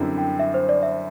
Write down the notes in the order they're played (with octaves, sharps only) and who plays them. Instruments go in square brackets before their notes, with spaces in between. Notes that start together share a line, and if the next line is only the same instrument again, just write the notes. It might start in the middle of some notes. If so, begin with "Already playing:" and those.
Already playing: [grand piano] F#2 D3 G3 C4 E4
[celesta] G5
E5
C5
D5
E5